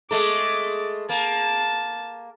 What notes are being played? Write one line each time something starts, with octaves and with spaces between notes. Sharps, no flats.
G#3 A3 A4 D6
A#3 A5